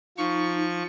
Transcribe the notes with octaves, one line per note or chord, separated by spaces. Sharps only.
F3 D#4 C#6